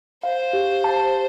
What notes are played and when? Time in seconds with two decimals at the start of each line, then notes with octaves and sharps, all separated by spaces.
0.23 C5 F5
0.53 G4
0.84 A5